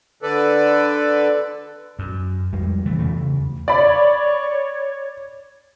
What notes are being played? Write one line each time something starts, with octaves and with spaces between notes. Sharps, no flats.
D3 A4 B4 D5
F#2
F2 G3 G#3
C#3 E3 A3
E2 C#3 A3
C#5 D5 B5